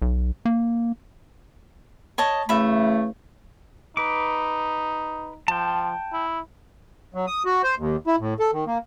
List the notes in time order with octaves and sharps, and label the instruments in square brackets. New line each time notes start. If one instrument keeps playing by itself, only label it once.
[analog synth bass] B1
A#3
[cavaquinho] C#5 D#5 A5
[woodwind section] C#3 E3 A3 [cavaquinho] E5 B5
[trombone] D#4 [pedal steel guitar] B4 D6
[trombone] F3 [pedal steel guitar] G5 A5
[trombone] E4
[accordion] F#3
D#6
F#4
C5
D#2
E4
A2
A4
D#3
A#3